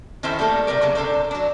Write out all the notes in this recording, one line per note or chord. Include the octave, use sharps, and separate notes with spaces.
D#3 C#4 E4 A4 C5 E5
G3 A3 A#3 A4
C3 G3 A#4 D5
A2 C#3 F#3 A#3
C3 D4 A4 C5 D5
F#3 D4